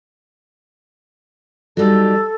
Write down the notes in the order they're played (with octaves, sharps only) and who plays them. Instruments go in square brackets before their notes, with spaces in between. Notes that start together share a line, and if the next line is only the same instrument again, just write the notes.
[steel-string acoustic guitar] F#3 G3 D#4 [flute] A4